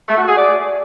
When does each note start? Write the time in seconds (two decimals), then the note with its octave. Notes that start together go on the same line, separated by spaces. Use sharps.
0.08 A3
0.17 F#4
0.27 G#4
0.37 D5